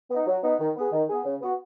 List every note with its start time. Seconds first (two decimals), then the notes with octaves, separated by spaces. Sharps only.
0.11 B3 D#4
0.27 F#3
0.43 B3 D#4
0.60 D#3
0.76 B3 G#4
0.93 D#3
1.09 B3 G#4
1.25 C#3
1.41 B3 F#4